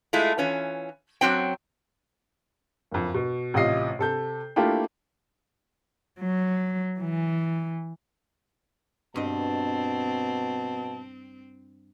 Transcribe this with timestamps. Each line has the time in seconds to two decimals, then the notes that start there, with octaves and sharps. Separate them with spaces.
0.13 G#3 A3 E4 F4
0.38 E3 C#4 F4
1.21 F#2 F3 F#3 C4 G5
2.92 F#1 F2
3.14 B2
3.54 A1 C3 F4 D#5 C7
3.99 C3 A4 G6
4.56 A3 A#3 D4 E4 F4 G4
6.20 F#3
7.00 E3
9.16 G2 B2 C4 D#5 A5